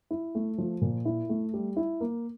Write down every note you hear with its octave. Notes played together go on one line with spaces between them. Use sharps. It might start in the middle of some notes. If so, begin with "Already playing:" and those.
E4
A3
F3
A#2
E4
A3
G3
E4
A#3